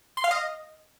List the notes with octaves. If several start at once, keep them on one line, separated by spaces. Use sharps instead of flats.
C6
F5
D#5